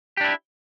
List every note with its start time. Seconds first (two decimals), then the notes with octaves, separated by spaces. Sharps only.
0.17 G4
0.21 D4
0.24 E4